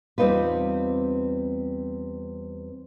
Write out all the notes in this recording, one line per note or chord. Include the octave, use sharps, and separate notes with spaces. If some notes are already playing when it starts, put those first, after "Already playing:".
E2 G3 C4 D#4 F4 B4